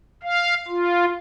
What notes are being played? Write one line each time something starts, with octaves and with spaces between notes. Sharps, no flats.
F5
F4